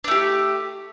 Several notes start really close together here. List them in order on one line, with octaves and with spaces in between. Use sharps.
D4 A3 G4